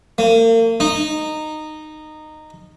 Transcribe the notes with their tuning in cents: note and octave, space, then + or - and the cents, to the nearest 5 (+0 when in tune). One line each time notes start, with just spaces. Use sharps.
A#3 -40
D#4 -15